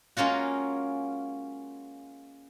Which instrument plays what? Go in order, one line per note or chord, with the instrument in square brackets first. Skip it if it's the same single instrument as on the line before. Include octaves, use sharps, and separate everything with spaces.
[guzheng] G#3 A#3 C#4 F4 F#4